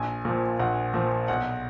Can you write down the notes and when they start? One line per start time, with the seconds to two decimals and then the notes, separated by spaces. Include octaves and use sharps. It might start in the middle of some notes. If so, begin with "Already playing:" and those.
Already playing: A#1 G#5
0.25 A#2 F3
0.60 A#1 F#5
0.94 A#2 F3
1.28 B1 F#5